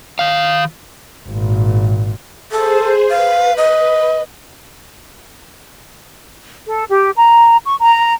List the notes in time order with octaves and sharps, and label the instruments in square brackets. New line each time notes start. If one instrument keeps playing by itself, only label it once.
[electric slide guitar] D#3 F5
[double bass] G#1 A#2
[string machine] G#4 C5 [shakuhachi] A4
[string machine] B4 [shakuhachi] F5
[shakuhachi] D#5
[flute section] A4
G4
A#5
C#6
A#5